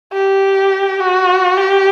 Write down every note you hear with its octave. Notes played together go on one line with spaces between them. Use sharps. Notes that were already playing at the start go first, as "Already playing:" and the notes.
G4
F#4
G4